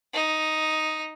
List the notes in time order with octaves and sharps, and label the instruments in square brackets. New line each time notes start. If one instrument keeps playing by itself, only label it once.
[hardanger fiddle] D#4